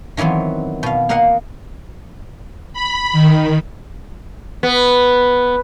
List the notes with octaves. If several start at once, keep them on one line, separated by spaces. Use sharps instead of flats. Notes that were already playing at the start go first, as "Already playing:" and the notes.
D#3 E3 F#3 B3 C4
B2 F5
A#3 A#4 D#5 F5 F#5
B5
D#3
B3